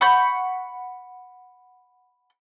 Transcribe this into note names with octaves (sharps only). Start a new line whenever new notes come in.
F#5 B5 C#6 G6